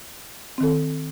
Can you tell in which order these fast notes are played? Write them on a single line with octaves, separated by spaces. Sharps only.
C4 D#3 A4